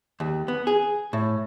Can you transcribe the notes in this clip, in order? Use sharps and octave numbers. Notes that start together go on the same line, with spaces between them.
D#2
B3
G#4
A2